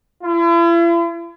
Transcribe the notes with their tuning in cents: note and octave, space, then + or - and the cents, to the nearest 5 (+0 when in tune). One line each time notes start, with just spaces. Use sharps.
E4 +45